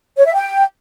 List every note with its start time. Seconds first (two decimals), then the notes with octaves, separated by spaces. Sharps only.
0.17 C#5
0.26 E5
0.35 G5